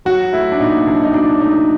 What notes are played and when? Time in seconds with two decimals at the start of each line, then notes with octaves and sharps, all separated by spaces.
0.05 F#3 F#4
0.33 A3 E4
0.52 D4
0.59 A#2 D#4
0.87 B1 D4
1.03 D#4
1.14 F#3 D4
1.41 A3 D#4